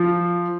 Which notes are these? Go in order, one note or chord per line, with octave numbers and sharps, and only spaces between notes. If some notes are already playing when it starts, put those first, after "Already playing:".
Already playing: F3